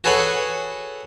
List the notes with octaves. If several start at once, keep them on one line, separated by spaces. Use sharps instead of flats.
F#4 G#4 A4 B4 C#5 F#5